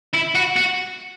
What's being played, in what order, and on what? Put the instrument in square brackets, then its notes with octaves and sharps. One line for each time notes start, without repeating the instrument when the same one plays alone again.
[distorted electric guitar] E4
F#4
F#4